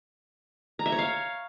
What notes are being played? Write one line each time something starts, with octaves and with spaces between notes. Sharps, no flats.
A#5
E5
C#5
F5